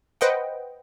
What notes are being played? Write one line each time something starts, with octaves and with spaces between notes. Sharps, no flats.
B4 C5 D#5 F#5 G5